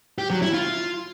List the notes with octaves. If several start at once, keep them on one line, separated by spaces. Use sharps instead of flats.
G4
F#3
E4
F4